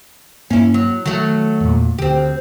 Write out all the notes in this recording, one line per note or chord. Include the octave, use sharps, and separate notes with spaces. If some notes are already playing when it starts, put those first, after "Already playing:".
G2 A#3 C#4 E4
F#3
D#3 F#3 A3
E2 A#2
D2 C4 G4